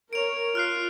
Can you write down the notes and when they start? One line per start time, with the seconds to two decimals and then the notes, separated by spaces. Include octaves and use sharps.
0.13 A#4 C#5 D7 F7
0.55 F4 F6 F#6 C7